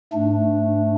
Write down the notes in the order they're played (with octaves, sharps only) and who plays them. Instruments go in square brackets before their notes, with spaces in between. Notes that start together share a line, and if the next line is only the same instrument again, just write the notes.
[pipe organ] G#2 A3 D4